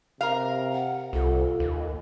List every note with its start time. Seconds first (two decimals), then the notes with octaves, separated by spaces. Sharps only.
0.21 C3 A#4 F5
0.73 F#5
1.13 C2 F4 A4
1.60 D#2